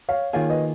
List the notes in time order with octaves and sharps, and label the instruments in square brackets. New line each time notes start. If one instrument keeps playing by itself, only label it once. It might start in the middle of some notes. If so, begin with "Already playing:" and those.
[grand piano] C#5 F5
[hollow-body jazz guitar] D#3 A#3 F4 G#4 [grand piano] C#5 F5
[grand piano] B4 D#5